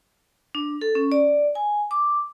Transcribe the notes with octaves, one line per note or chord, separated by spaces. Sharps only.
D4
A4
C#4
D5
G#5
D6